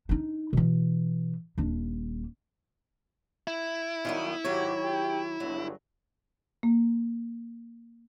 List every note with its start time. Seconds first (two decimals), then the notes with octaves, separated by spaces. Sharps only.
0.09 D4 D#4
0.53 B2 E3
1.58 D#1 D4
3.47 E4
4.05 D#3 F#3 G3 A#3 B3 C#4
4.44 G#2 D#3 F#3 F#4 G4 C#5
4.83 G4 E5 G5
5.40 G1 C#2 G2 F#3
6.63 A#3